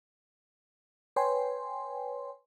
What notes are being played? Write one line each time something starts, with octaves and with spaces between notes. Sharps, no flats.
B4 C#5 G5 G#5 C6